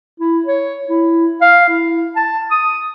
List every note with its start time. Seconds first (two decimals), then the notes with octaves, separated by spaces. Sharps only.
0.20 E4
0.46 C#5
0.88 E4
1.41 F5
1.69 E4
2.16 A5
2.51 D#6